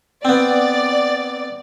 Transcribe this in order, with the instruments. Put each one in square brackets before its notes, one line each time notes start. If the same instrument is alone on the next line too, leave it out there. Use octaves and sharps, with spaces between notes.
[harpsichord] B3 C4 [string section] D5